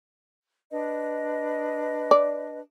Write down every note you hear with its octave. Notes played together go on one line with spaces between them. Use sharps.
D4 B4 D#5
D5